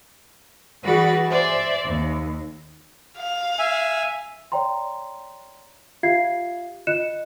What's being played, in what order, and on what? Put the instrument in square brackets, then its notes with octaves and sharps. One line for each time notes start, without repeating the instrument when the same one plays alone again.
[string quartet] E3 G3 F#4 G#4 B4 D5
C5 D5 E5 G#5
D#2
[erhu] F5
[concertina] E5 G#5
[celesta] C#5 D5 G5 A#5 C6
F4 G4 E5 F5 G#6 C7
F4 D#5 F#6 C#7 E7